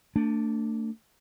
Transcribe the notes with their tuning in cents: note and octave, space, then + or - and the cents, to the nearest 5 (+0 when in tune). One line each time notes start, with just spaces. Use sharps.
A3 +35 D4 -5